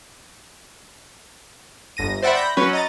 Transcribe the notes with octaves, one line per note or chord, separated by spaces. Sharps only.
G1 A#6 D#7
C5 D5 E5 F#5 G5 B5
B5 G6 A#6
F#3 C#4 F#4 B4
D#5 A#5 A6